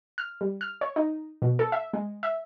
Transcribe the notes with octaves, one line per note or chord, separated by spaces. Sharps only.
F6
G3
F6
C#5
D#4
B2
A4
E5
G#3
E5